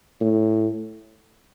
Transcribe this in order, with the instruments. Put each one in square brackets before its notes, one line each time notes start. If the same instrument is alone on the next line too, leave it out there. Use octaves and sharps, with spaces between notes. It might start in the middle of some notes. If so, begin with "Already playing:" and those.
[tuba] A2